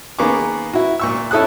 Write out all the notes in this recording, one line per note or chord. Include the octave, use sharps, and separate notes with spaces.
D#3 A#3 B3 G#4 C#6 D6
E4 F#4
A#2 C#6 E6
C#4 E4 A4 D#6 F#6